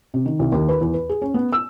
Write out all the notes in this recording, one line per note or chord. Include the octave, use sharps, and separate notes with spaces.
C3
D#3
C2
D#2
B4
E2
B4
G#4
C#4
B3
E6